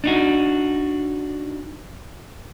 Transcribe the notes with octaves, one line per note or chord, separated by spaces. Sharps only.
D4 D#4 F#4